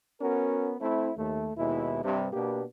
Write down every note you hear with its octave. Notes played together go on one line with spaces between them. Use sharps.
B3 C#4 F#4 A#4
A3 C4 E4
D#2 A3
D#2 B2 G#3 E4
G2 C3
B2 A#3 B3 D4 G4